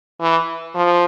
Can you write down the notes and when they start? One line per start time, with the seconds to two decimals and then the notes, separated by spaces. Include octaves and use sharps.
0.21 E3
0.75 F3